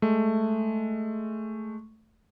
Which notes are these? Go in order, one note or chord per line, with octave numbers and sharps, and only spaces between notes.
G#3 A3